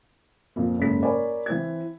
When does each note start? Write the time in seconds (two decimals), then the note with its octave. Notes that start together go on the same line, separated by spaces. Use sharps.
0.56 F2 A#2 F3
0.79 F#1 G#2 A4 B6
1.03 A#4 C#5 D5 G#5 B5
1.46 E3 C4 G#6